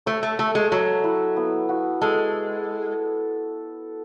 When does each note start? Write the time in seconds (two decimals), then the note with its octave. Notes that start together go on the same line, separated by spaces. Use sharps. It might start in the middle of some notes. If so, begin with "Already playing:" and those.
0.06 A3 C#5
0.23 A3
0.39 A3 A4
0.55 G#3
0.71 F#3 E5
1.04 E4
1.36 B3
1.69 F#4
2.01 G#3 A4